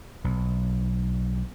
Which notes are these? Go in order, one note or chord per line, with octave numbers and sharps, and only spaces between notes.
B1